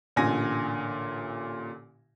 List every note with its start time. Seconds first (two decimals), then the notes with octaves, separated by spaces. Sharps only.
0.16 A1 A#2 D3 G#5 A#6